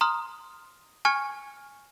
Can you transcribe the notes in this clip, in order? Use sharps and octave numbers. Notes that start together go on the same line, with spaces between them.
A#5 C6 D#6 F6
G#5 C#6 F6 G#6 C#7